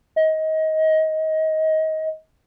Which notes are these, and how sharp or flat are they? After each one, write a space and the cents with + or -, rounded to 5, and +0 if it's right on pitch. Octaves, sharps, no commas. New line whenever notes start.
D#5 +25